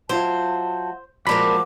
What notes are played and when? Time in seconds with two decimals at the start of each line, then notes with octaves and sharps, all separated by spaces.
0.09 F#3 E4 F4 C5 A5
1.27 A#2 F3 G#3 D4 F#4 A#4 B5 D6